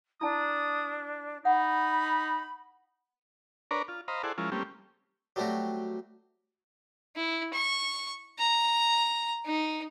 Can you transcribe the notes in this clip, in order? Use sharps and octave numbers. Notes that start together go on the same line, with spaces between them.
D4 E4 A5 D#6
D#4 F#5 B5
D4 A#4 B4 C#5 D5 A#5
F4
C5 D#5 F5 A#5 B5
E4 G#4 A4 C5 D5 F#5
F3 G#3 C#4 E4 F4 A#4
G3 A3 A#3 C4 C#4 G4
F#3 G3 A3 C4 F#4 G4
E4
C#6
A#5
D#4